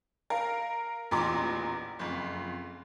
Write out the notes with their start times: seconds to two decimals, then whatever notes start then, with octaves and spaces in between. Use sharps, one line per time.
0.30 A#4 F5
1.11 A1 E2 A#2 A#5 C6 D6
1.99 F#1 F2